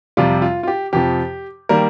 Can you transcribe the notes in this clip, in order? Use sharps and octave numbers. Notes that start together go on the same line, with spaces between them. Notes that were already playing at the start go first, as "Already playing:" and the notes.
F2 C3 G3 F4
F4
F4
G4
F2 C3 F3 G4
D#3 G3 A#3 A#4